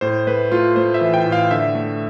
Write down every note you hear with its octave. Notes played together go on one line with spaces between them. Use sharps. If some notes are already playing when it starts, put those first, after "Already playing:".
A2 C5
A3 B4
A3 F4
A3 C5
E5
E3
G5
A2
F5
D3 E5
A3